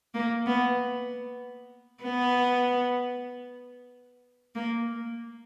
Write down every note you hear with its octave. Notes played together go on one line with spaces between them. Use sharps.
A#3
B3
B3
A#3